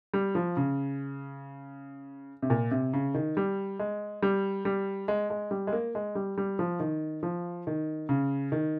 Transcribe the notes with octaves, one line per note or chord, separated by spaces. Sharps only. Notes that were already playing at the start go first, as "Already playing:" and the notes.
G3
F3
C#3
C3
A#2
C3
C#3
D#3
G3
G#3
G3
G3
G#3
G#3
G3
G#3
A#3
G#3
G3
G3
F3
D#3
F3
D#3
C#3
D#3